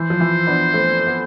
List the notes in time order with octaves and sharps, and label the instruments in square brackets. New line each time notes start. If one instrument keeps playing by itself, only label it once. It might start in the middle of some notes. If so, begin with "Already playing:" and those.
Already playing: [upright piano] E3 [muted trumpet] C5
[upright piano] F3
E3
B3 D4
A3 C4
B3